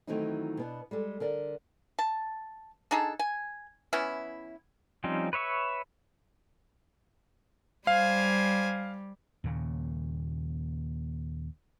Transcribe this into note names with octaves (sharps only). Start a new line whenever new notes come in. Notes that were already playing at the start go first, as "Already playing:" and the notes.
D#3 E3 F#3 A3 C4 D#4
B2 B3 D4
G3 G#3 A4
D3 A#4 D5
A5
D4 D#4 G#4 A4
G#5
E3 B3 C#4 E4
F3 G3 C4 C#4 D#4
B4 C#5 E5 C#6
G3 C5 F5 G#5
D#2 A#2 C#3